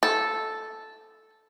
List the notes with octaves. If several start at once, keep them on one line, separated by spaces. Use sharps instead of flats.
A4